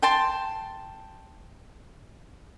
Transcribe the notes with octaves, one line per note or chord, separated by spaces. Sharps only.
G5 A5 C6